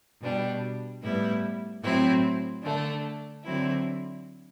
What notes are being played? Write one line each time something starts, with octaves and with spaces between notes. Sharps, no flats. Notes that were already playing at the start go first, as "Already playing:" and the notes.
B2 G3 D4
A2 G3 B3 E4
A2 F#3 C4 E4
D3 A3 D4
D3 F#3 C4 E4